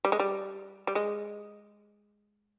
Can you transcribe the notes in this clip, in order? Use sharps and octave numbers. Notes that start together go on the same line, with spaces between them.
G3
G#3
G3
G3
G#3